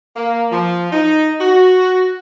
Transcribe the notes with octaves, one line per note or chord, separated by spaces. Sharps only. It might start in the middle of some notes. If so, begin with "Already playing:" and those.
A#3
F3
D#4
F#4